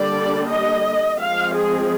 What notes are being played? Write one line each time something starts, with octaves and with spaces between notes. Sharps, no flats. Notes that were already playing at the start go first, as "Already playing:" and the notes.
Already playing: D3 G3 A#3 D4 D5
D#5
F3 G#3 C4 F5
G#4